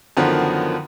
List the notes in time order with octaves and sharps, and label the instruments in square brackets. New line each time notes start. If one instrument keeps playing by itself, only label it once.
[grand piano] F#2 D3 D#3 F3 B3